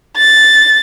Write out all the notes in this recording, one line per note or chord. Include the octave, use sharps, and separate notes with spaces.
A6